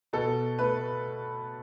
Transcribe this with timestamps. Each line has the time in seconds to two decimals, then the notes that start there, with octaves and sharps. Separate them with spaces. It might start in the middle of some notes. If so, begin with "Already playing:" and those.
0.13 B2 A4
0.59 A3 B4